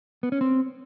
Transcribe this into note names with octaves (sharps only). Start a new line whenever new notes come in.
B3
C#4
C4